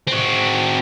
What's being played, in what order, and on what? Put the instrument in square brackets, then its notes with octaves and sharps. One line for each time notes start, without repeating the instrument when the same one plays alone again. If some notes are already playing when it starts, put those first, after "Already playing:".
[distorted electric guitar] C4 F#4